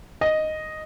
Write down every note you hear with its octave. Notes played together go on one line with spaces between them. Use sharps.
D#5